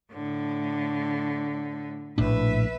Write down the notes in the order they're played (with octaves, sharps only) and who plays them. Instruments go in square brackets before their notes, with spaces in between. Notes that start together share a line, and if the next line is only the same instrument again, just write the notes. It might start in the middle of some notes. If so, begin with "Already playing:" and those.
[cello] A2 D3
[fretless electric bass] A#1 A2 D4 [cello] B4 E5